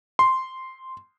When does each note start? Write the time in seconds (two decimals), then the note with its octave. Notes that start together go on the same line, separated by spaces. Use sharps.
0.19 C6